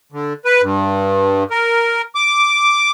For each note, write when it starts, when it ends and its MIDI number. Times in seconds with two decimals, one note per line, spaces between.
0.12 0.33 50
0.45 0.62 71
0.62 1.44 43
1.51 2.02 70
2.15 2.91 86